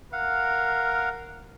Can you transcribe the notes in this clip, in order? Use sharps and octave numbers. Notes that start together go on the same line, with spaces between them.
A#4 F5 F#5